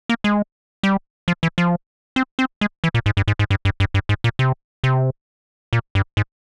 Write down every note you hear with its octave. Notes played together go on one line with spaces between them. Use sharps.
A#3
G#3
G3
F3
E3
F3
C4
C4
G#3
E3
A#2
G#2
G2
G#2
G#2
G2
G2
G2
G2
G#2
A#2
C3
C3
A#2
G2
G#2